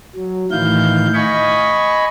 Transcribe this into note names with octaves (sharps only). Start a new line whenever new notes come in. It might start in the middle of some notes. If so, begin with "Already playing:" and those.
F#3
A2 D#3 E3 E4 F5 G6
D#5 G#5 B5 C#6